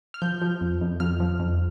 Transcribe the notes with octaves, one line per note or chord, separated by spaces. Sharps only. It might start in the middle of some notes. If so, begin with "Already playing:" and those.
F6
F3 G6
F3
F2
F2
F2 F6
F3
F2